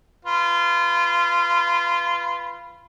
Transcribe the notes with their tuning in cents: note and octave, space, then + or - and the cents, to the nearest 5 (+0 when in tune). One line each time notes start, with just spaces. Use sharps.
F4 -20 B4 +0